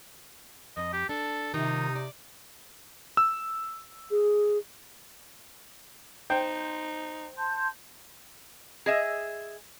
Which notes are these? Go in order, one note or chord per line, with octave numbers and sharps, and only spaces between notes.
F2 D#5
G4
D4 A4
C3 D#3 G3 D#4 F4
D5
E6
G#4
D#4 C5 G5
A5 C6 G6
G#4 D#5 E5